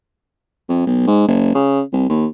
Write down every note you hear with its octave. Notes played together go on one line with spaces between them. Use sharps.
F2
B1
G#2
F#1
C#3
C2
D#2